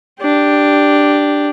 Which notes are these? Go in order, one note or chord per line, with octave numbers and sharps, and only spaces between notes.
D4 G4